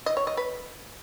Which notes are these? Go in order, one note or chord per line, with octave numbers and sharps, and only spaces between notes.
D#5
C#5
D#5
B4